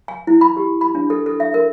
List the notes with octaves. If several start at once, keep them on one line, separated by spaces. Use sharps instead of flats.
G#5
E4
B5
G4
B5
D4
A4
A4
E5
A#4